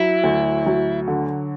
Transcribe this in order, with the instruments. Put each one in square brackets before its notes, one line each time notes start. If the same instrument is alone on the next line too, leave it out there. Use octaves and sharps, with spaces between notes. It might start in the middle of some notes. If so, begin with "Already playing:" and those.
Already playing: [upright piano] F#3 [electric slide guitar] E4
[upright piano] D2
F#3
D3